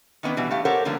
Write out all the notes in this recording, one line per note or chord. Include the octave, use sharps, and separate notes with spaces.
D#3 E3 B3 D4
B2 E3 G3
A3 G4 F5
G4 A4 A#4 C5 C#5 F#5
D3 F3 G3 A#3 B3 D4